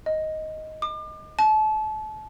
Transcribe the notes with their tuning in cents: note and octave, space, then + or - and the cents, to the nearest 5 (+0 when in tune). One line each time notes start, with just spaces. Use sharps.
D#5 +5
D6 +40
A5 -35